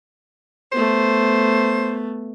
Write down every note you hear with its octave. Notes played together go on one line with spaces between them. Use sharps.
A3 B3 C5